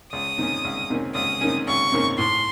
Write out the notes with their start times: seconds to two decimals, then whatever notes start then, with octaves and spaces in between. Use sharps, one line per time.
0.13 C#2 D#6
0.38 C3 D#3 A#3 C#4
0.65 C#2
0.90 C3 D#3 A#3 C#4
1.15 C#2 D#6
1.41 C3 D#3 A#3 C#4
1.67 C#2 C#6
1.92 C3 D#3 A#3 C#4
2.18 A2 C6